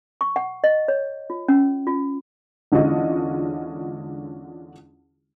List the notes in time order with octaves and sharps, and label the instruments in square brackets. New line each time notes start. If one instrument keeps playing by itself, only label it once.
[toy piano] C#6
F#5
D#5
C#5
F4
C#4
F4
[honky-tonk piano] E2 D3 G#3 C#4 F4 D#5